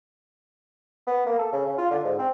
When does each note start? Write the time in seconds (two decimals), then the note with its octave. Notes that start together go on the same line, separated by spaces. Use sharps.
1.07 B3
1.26 A#3
1.39 A4
1.52 C#3
1.66 C#3
1.78 F4
1.91 D3
2.04 G#2
2.19 C4